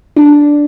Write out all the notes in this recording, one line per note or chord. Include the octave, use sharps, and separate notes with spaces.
D4